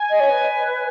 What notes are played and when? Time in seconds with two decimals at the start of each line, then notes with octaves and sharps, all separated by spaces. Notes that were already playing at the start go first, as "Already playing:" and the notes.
Already playing: G#5
0.10 D#5
0.20 C#5
0.29 B4